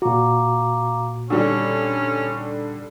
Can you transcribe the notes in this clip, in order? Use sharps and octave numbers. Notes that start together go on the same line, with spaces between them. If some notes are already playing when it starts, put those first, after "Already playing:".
A#2 F#4 F5 A#5 D6
D3 D#3 G3 C#4 D4